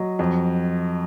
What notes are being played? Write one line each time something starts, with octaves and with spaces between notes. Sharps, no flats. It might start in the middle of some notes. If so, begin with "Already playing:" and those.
Already playing: F#3 D#5
F2